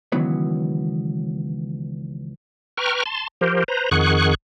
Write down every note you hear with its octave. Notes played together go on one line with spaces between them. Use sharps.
C#2 D#3 E3 F#3 B3 C#4
B4 G5 A#5 C#6 F6
A5 C6
F3 G4 A#4 C5
B4 C5 A#5
F2 D#3 G#4 F#5 C#6 F#6